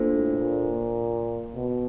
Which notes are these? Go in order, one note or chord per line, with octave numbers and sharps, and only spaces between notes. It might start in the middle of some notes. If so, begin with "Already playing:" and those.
Already playing: A#3 D4 F4 A4 C5
A2
A#2
B2